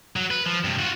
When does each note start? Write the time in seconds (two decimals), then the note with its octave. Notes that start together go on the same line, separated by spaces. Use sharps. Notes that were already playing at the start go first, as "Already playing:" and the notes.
0.16 F#3
0.31 B4
0.46 F3
0.64 G2 C3
0.79 F4 F#4